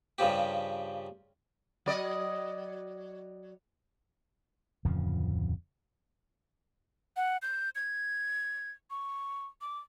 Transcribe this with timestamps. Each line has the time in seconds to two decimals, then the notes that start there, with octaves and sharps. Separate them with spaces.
0.18 G2 C#3 F3 G4
1.86 F#3 D5 D#5
4.85 D1 F2 C#3 F3
7.17 F#5
7.42 G6
7.75 G#6
8.90 C#6
9.61 D6